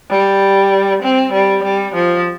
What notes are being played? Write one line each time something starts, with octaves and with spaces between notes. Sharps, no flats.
G3
C4
G3
G3
F3